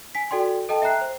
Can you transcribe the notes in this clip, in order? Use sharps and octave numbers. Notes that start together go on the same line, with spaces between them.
G#5 B6
F#4 A4 D5 G5 C6
A4 D#5 G5 A5
E5 G5 A#5 F#6 C7
C5